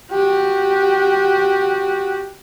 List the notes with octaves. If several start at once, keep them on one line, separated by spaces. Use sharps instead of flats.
F#4 G4